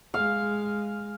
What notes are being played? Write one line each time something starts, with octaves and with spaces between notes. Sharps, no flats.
G#3 F5